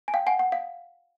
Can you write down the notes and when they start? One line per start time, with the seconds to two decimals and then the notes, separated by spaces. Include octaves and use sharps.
0.08 G#5
0.14 F5 G5
0.27 F#5 G#5
0.39 F#5
0.52 F5